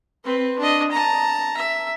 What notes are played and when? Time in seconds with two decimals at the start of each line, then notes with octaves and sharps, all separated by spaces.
0.24 C4 B4
0.59 D4 D#5
0.91 A5 A#5
1.57 E5